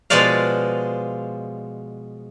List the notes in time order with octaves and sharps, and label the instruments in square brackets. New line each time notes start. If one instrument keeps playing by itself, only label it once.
[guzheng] B2 F3 G#3 F4 D5 F5